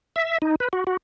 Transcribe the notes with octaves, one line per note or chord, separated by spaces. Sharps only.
E5
D#4
B4
F#4
F#4